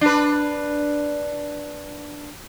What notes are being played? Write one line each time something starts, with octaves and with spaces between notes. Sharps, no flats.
D4 B4